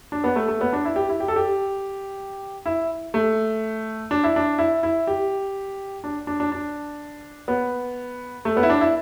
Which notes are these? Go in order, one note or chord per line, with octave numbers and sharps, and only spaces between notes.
D4
B3
A3
A3
B3
D4
E4
G4
E4
G4
A4
G4
E4
A3
D4
E4
D4
E4
E4
G4
D4
D4
D4
D4
B3
A3
B3
E4
D4
E4